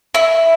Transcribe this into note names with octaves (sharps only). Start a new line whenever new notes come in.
E4